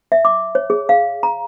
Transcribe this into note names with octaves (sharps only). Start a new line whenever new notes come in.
E5
D6
C#5
G#4
F5
A#5